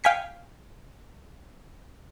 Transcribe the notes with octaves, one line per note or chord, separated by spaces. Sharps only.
F5 G5 G#5 B6 C#7